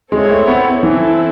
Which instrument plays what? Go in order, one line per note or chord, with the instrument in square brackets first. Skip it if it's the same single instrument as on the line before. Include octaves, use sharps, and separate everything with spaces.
[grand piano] G#3 [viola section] C4 E4 A4 C#5
[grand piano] A3
B3
[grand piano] E3 [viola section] C4 E4 A4